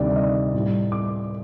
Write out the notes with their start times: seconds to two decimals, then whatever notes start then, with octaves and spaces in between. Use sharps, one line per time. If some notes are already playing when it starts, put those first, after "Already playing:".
Already playing: D2 C3 D#3 G3 D5
0.16 D#5
0.53 A2 G3
0.92 D6